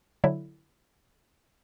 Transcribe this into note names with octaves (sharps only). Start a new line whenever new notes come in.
D3 F#3 E4